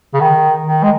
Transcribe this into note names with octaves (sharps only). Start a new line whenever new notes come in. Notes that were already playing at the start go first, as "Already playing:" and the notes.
C#3
D#3
D#3
G#3